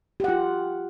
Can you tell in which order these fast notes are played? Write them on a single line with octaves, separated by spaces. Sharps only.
G4 F#5 F4